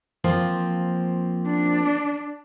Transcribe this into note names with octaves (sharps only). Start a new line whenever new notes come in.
F3 A#3 C4
D4